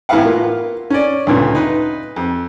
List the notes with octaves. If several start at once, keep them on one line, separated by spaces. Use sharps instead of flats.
A2 E3 B3 B4 F5 F#5
A#3 F4
C#4 D5
D2 G2 A#2 C#3
D#4 B4
F2